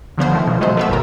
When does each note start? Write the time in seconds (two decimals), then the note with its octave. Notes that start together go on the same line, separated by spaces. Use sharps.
0.18 D3 F3 B3 C5
0.32 D#3 F3 A3
0.47 B2 F3
0.61 F#3 G#3 A3 C5
0.77 A3 B3 E5
0.89 G#1 D#2 B2 A#4